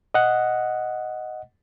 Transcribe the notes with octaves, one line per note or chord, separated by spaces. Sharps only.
D#5 F#5